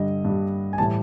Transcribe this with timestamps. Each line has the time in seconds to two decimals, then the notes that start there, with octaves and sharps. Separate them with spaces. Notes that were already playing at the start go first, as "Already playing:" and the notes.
Already playing: G2 D3 G3 D#5
0.25 G2 D3 G3
0.73 G#5
0.78 A2 E3 G3 A5